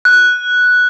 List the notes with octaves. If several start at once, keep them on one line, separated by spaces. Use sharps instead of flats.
F#6